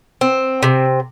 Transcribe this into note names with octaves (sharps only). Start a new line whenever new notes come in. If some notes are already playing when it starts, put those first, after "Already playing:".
C4
C3